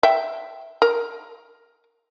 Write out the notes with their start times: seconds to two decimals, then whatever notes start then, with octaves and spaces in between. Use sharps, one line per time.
0.03 E5 G5
0.82 A#4